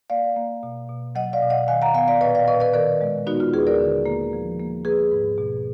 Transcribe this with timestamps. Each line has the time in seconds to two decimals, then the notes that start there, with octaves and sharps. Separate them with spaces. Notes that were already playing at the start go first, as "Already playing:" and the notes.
0.10 A#3 D5 F5
0.36 A#3
0.63 B2
0.89 B2
1.15 F#3 D#5 F#5
1.33 D5 F5
1.42 B2
1.50 D#5 F#5
1.68 D#3 F5 G#5
1.82 F#5 A#5
1.94 B3 F5 G#5
2.08 D5 F5
2.21 A#2 B4 D#5
2.35 D5 F5
2.48 A#2 B4 D#5
2.60 B4 D#5
2.74 D#3 A#4 D5
3.01 G#3
3.27 B3 D#4 F#4
3.40 F4
3.53 D#2 G#4 B4
3.67 A#4 D5
3.80 D3
4.06 A#3
4.33 F3
4.60 A#3
4.85 A#3 G#4 B4
5.11 G#2
5.38 B2